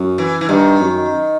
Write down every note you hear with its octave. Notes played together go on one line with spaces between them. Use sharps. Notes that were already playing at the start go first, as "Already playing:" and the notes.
Already playing: F#2
E3
E3
G2 D#3
F#2